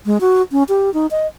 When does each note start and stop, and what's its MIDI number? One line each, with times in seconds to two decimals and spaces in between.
0.06 0.18 56
0.21 0.42 66
0.52 0.63 61
0.69 0.92 67
0.94 1.07 63
1.11 1.27 75